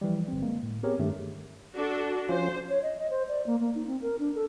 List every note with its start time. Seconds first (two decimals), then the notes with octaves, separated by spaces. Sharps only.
0.01 E3 F3 G3
0.28 G1 C4
0.42 G#3 A#3
0.63 A2
0.83 B3 C4 G4 G#4 A#4 C#5
0.99 G2 D#3 A3 G4
1.76 D4 F#4 A4
2.29 F3 C#4 F4 C5
2.70 C#5
2.83 D#5
2.97 D#5
3.10 C5
3.29 D5
3.47 A#3
3.60 A#3
3.75 D#4
3.87 C4
4.02 A#4
4.19 D4
4.35 A4